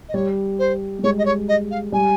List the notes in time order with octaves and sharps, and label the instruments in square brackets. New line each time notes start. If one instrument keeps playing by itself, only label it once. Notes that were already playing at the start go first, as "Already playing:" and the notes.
[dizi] D#5
[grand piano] G3 [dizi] C#5
[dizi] C5
[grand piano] G3
[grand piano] G#3 [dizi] C#5
[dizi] D#5
C#5
D#5
F5
[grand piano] G3 [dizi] G#5